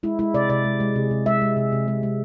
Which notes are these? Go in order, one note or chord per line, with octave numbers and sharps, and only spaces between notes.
G#3 E4
G#3 E4
C3 D5
C3 D5
G#3
G#3
C3
C3
G#3 E5
G#3
C3
C3
G#3
G#3